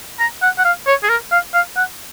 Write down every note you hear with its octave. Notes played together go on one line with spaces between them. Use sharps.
A#5
F#5
F#5
F5
C#5
G#4
A#4
F5
F5
F#5